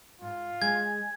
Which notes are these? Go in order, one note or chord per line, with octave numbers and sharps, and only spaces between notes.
G#2 F4
G#3 G#5 G#6